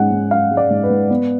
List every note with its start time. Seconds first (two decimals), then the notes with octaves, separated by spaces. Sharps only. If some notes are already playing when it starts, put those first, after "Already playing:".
Already playing: G#2 G#3 C#4 F#5
0.11 G#2
0.31 C#4 F5
0.51 G#3
0.57 D5
0.70 G#2
0.83 B4
0.90 G#2
1.10 B3